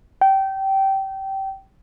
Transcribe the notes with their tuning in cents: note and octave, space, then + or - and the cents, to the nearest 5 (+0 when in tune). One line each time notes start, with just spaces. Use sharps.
G5 -20